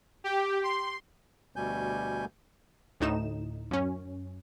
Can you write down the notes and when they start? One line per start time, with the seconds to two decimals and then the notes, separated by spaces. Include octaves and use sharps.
0.24 G4
0.63 C6
1.56 D2 B2 G3 G#5 G6
3.00 D2 A2 D#4 E7
3.71 F#2 C#4